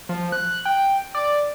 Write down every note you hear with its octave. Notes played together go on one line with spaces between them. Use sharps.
F3
F#6
G5
D5